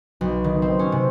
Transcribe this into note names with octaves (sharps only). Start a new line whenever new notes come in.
B1
D#3
C4
C#4
C3